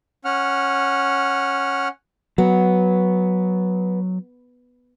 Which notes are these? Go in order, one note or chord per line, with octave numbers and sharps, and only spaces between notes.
C#4 F#5 F6
F#3 B3